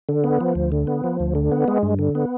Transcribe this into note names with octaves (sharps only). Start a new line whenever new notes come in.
D3
B3
F3
D2
D3
B3
F3
D2
D3
B3
G#3
G2
D3
B3